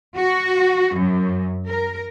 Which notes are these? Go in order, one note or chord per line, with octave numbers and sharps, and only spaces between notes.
F#4
F#2
A#4